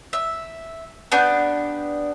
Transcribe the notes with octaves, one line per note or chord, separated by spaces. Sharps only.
E5
B3 D4 G4 G6